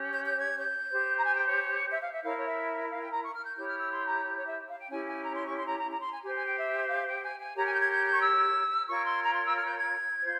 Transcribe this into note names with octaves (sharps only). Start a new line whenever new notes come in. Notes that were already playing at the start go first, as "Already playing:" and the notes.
Already playing: C#4 G4 C#5
G6
G6
G#6
G6
G4 C5
A#5
G#5
G5
C#5
E5
F5
E5
E4 A#4 C#5 F5
C#5
E5
F5
G5
A#5
C#6
F6
G6
E4 G4 C#5 G6
F6
E6
C6
A#5
C#5
E5
F5
G5
C#4 E4 G4 G#5
G#5
A#5
C6
C#6
C6
A#5
A#5
A#5
C6
G#5
G4 C5 G#5
G#5
G5
E5
F5
G5
G#5
G#5
G4 A#4 C#5 A#5
G#5
G6
G#6
G6
G6
C#6
E6
F4 A#4 C#5 C#6
C6
A#5
C6
E6
F6
G6
G#6
F4 C5